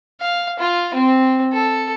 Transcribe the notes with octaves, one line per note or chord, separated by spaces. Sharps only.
F5
F4
C4
A4